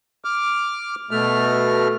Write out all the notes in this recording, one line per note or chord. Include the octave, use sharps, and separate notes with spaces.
D6 F6
B2 A3 F6